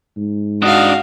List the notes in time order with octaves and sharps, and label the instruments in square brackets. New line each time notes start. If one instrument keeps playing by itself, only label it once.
[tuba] G#2
[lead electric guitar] D4 D#5 [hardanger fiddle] F#4 F5